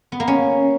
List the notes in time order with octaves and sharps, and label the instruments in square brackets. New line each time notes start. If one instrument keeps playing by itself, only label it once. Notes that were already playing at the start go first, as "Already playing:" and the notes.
[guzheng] B3
A#3
C#4